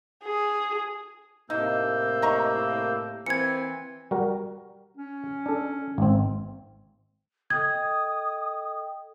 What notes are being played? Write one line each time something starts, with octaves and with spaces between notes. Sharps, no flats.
G#4
A2 C3 A#3 D#4 E6 G6
D#5 A#5 C#6
E3 A#3 C4 G#6 C#7
G3 F#4 A#4
C#4
D4 A4
G#1 C4
A4 D#5 G5 D#6 G#6